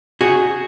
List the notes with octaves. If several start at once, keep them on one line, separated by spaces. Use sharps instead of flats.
F#4 G#4